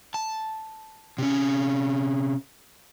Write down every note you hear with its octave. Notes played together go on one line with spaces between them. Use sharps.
A5
C3 C#4